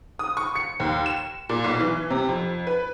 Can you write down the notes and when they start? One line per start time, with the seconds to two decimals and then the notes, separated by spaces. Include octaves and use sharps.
0.19 D#6
0.37 C#6
0.55 C#7
0.80 D#2
1.06 E7
1.49 A#2
1.64 B1
1.80 E3
2.10 C3
2.29 F2
2.67 B4